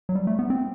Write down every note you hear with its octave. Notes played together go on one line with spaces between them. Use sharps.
F#3
G3
A3
B3
C4